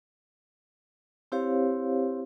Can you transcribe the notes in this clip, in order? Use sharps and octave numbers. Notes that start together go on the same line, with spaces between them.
C4 E4 G4 C5 C#5 F5